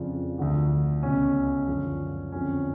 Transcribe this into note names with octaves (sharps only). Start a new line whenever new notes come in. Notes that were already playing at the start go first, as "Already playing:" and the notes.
Already playing: F2 C#3 F3 D4
D2 D3 F3
C#2 B2 C#4
F#2 D3 F3
F2 D3 F3 C#4